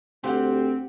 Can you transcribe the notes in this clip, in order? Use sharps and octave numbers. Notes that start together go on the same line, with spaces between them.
D2 C4 G4 F#5